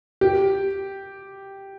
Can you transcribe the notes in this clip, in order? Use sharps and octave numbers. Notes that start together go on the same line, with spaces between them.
G4